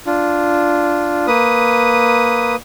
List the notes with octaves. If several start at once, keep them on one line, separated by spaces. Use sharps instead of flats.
D4 F4
A#3 B4 D#6